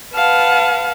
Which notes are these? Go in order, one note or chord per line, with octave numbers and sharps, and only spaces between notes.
B4 F5 F#5 A5